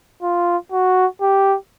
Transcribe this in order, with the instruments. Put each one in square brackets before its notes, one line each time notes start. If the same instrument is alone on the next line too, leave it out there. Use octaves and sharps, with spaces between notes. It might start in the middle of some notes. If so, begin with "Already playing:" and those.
[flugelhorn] F4
F#4
G4